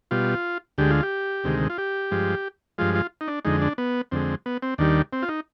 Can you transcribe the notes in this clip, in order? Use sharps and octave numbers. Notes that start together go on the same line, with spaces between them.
B2 G3 F4
D2 D3 G#3 G4
F4
G4
D2 C3 D#3 G#3
F4
G4
G2 F3 G#3
G2 F3 G#3 F4
F4
D#4
D4
F2 D3 G#3 D#4
D4
B3
F2 D3 G#3 C4
B3
C4
D#2 D#3 G3 D4
C4
F4
D#4